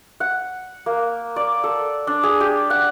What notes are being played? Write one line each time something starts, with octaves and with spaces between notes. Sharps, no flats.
F#5
A#3
D5
A4
D4
G#4
G4
F#5